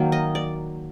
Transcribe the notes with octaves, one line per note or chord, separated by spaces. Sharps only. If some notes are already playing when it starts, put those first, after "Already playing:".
Already playing: D#3 F#3 A#3
D#5
D5